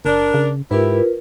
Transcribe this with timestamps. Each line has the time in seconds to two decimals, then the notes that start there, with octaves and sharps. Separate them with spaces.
0.05 F#1 D4 A#4
0.34 C#3
0.71 G#2 E4 F4 G4 A#4 B4